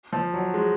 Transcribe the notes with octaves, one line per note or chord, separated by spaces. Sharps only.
F3
F#3
G#3